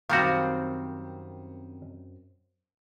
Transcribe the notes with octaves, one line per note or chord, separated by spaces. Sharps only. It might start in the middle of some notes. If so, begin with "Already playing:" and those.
F#2 D#3 G3 C4 F#4 F5